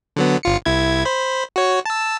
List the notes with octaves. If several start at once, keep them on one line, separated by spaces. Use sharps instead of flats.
D3 F#3 B3
G1 F4 C#7
C2 E4 G#6
C5 B5
F#4 C#5
A5 E6